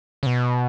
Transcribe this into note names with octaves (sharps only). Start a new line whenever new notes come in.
C#3
B2